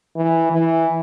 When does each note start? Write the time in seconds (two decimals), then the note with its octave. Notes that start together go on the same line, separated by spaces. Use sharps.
0.16 E3
0.52 E3